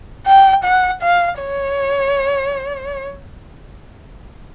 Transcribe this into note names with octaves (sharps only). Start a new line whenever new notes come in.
G5
F#5
F5
C#5